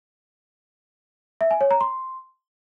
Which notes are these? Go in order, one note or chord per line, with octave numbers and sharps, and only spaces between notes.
E5
G#5
C#5
A#5
C6